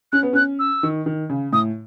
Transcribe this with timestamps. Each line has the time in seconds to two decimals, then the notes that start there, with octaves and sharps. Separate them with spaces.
0.12 C#4 F#6
0.23 B3
0.33 C#4 F#6
0.59 E6
0.83 D#3
1.06 D#3
1.29 C#3
1.52 A2 D#6